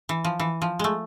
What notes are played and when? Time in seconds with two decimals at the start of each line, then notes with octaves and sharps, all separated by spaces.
0.09 E3
0.24 F3
0.39 E3
0.62 F3
0.79 G#3 A3